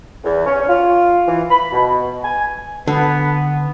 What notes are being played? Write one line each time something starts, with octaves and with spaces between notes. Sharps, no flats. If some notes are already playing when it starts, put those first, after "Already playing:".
E2
C#4
F4
E3
B5
B2
G#5
D3 B3